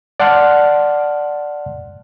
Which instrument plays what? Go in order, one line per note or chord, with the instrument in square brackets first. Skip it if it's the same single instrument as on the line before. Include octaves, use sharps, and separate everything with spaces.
[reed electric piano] D5 F#5 A5 C6 F6 F#6